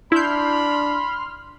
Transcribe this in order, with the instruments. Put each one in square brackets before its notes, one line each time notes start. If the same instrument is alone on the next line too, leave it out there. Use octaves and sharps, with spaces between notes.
[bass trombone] D4 [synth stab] E4 G6 [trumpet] B5 [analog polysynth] C6 F6